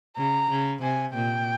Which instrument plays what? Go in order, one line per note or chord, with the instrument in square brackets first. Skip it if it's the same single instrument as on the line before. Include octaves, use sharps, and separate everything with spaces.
[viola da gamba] C#3 [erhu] A#5
[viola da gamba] C#3
[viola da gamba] C3 [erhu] G#5
[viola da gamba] A#2 [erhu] G5